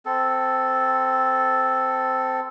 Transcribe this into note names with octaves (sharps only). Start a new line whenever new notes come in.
C4 A4